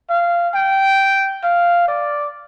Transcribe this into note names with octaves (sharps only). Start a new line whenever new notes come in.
F5
G5
F5
D5